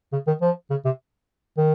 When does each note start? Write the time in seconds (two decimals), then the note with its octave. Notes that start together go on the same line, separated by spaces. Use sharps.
0.13 C#3
0.27 D#3
0.42 F3
0.71 C#3
0.85 C3
1.58 D#3